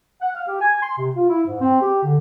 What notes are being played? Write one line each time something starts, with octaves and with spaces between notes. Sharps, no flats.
F#5
F5
G4
G#5
C6
C3
F4
E4
G#2
C4
G4
D3